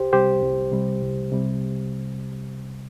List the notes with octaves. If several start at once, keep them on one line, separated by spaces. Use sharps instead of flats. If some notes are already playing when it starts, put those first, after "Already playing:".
Already playing: C2 G4 C5
C3 G3 G4 C5
C2
C3 G3
C2
C3 G3